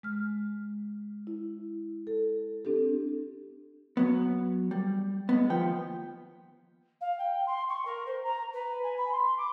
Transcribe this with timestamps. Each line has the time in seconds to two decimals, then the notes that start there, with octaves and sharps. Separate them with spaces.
0.03 G#3 F6
1.27 E4
2.07 A4
2.65 C4 D4 G4 A4
3.97 F#3 B3
4.71 G3
5.29 G#3 B3
5.50 D#2 F3 B3 G5
7.01 F5
7.18 G5
7.47 C6
7.69 C#6
7.85 A#4
8.06 C5
8.24 A#5
8.53 B4
8.83 G#5
8.97 B5
9.12 C6
9.38 D6